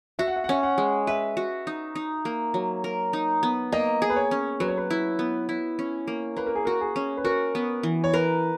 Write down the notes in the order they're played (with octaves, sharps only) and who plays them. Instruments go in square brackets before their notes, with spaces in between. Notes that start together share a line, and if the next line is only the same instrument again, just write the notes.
[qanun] F#4 [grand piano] E5
[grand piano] F#5
E5
F#5
[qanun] C#4 [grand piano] E5
[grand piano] F#5
[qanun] G#3
[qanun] B4 [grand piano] E5
[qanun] F#4
D#4
D#4
A#3
F#3
A#4
D#4
B3
[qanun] A#3 [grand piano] D#5
[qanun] G#4
[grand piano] B4
C#5
[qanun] C#4
[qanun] F#3 [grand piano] B4
[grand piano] C#5
B4
[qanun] E4
B3
E4
C#4
A#3
[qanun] A#3 [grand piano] B4
[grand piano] A#4
G#4
[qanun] F#4 [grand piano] A#4
[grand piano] G#4
[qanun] C#4
[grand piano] B4
[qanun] F#4 [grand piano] A#4
[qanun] B3
E3
[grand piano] C#5
[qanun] A#4 [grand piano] B4